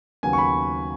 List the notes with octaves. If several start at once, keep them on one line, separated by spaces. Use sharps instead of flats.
D#2 C#3 F#3 B3 G#5
C#6
B5